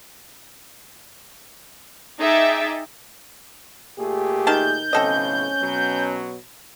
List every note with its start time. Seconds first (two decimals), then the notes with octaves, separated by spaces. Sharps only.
2.19 D#4 G#4 E5 G5 D6 A6
3.98 A#2 A3 G4 G#4
4.47 D#3 A5 G6
4.93 B1 A2 C#3 C4 C#4 A4 D#5
5.61 B2 F#3